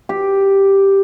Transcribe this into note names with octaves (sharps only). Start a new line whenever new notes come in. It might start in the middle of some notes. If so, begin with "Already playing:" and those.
G4